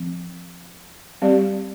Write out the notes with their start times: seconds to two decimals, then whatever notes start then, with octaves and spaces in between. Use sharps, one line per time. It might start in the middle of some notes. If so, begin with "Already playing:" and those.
Already playing: F3 C4
1.22 G3 C4 G4 D5